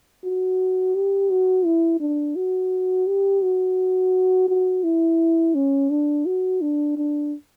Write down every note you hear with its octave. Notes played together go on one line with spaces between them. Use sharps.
F#4
G4
F#4
E4
D4
F#4
G4
F#4
F#4
E4
C#4
D4
F#4
D4
D4